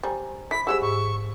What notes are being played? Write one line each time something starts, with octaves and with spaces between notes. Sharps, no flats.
G3 C5 G#5 A#5
E4 B5 B6
G3 G#3 F#4 G4 C5 E6
G#2 C#6